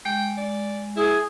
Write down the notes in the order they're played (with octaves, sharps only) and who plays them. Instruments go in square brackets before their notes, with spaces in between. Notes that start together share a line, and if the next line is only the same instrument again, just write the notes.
[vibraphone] G#3 [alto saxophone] G5
[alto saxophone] D5
[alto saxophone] E4 [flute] G#4